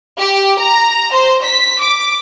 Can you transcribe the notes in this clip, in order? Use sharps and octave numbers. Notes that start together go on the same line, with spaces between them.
G4
A#5
C5
B6
D6